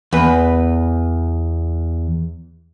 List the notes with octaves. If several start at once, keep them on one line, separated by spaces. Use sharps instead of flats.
E2 B4